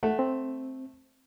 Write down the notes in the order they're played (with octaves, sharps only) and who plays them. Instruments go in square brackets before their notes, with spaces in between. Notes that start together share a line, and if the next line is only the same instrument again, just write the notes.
[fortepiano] A3 [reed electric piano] F#5
[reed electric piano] C4